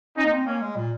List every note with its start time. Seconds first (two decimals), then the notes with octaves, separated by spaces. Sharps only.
0.17 C#4 D#4
0.24 A#3
0.32 C4
0.46 A#3 C#4
0.62 G#3
0.76 A#2